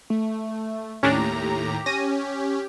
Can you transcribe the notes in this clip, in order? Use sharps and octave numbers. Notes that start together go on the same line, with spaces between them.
A3
D#2 A2 C#4 D4 G4 A#5
C#4 A#6 D#7